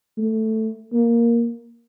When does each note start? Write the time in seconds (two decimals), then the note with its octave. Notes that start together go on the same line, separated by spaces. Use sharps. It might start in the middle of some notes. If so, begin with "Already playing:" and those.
0.18 A3
0.93 A#3